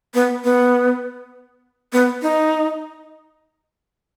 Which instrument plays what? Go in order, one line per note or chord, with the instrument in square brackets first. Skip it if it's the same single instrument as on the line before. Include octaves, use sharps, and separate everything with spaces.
[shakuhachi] B3
B3
B3
D#4